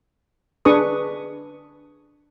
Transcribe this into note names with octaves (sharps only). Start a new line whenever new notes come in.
D4 G#4 B4 C#6 D#6